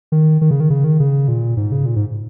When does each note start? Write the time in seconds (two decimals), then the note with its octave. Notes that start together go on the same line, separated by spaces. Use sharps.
0.12 D#3
0.41 D#3
0.51 C#3
0.60 D#3
0.70 C#3
0.84 D#3
1.00 C#3
1.28 A#2
1.57 G#2
1.72 C#3
1.86 A#2
1.96 G#2